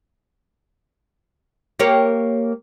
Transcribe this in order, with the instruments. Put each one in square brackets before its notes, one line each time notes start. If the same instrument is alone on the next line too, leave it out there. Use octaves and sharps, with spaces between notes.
[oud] A#3 G4 C#5